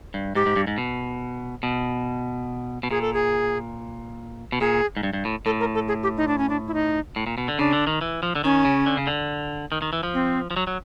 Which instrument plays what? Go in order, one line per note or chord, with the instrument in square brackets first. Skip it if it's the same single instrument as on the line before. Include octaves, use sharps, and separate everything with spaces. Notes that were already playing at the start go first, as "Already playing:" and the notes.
[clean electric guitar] G2
[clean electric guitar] G#2 [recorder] G4
[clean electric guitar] G#2
G2
G#2
B2
B2
B2
[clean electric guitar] A#2 [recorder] G#4
[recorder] A4
G#4
[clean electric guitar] B2
[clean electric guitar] A#2 [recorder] G#4
[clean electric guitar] G#2
G2
G2
A2
[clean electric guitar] A2 [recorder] A4
[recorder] A#4
A4
G#4
G4
D#4
D4
C#4
D4
E4
D#4
[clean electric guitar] A2
A#2
B2
D3
[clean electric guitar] C#3 [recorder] D4
[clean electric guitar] D3
D#3
E3
F3
D3
[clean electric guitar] D#3 [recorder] C#4
[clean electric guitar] C#3
D3
C#3
D3
D#3
D#3
E3
F3
[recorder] C4
[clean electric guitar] F3
F#3
F#3